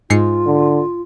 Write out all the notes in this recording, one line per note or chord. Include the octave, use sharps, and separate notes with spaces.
G#2 F4 C7 C#7
D3